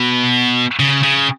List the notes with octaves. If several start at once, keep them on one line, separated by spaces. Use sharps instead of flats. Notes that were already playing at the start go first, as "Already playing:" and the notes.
Already playing: B2
C#3
C#3